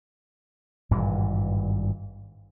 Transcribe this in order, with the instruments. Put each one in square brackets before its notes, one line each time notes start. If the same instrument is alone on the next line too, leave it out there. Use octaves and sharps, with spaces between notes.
[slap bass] G#1 G2 A#2 E3